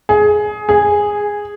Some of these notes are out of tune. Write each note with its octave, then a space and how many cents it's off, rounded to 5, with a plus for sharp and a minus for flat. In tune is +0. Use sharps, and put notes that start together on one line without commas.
G#4 +15
G#4 -10